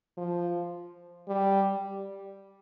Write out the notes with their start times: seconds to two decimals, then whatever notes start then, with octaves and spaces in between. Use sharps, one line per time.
0.17 F3
1.28 G3